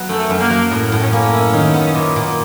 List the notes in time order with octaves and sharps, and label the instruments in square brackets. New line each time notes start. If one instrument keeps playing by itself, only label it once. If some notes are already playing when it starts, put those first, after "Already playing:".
Already playing: [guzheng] F#3 B3
[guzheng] F#2 [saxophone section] A3
[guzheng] F#2
[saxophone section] A#3
[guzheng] F#3
A2
A2
[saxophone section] C#4
[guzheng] A#3
E4
D#3
B3
A#2
A#2